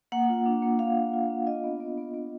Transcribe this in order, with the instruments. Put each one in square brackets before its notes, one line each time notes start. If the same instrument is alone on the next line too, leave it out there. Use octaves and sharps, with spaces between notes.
[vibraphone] A#3 F#5
F4
D4
A#3
A#3 F5
D4
F4
D4
F4 D#5
B3
B3
B3
B3